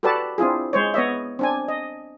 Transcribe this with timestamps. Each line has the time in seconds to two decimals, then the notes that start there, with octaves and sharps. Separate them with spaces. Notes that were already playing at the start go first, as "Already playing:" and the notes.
0.03 F#4 G4 A4 B4 D5 A5
0.38 C4 D4 E4 F4 G#4
0.73 G#3 C5 C#5
0.94 B3 C#5 D#5 E5
1.39 C4 D4 G#5
1.68 D#5